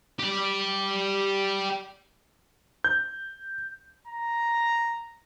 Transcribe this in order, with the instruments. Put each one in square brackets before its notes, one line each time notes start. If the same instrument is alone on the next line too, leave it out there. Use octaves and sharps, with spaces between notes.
[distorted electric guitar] G4 D5
[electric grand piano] G6
[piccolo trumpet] A#5